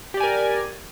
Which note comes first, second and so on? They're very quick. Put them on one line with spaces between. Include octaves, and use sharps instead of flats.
G4 D5 G#5 A#4